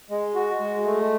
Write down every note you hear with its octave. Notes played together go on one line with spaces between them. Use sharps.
G#3
F#4
G#3
A3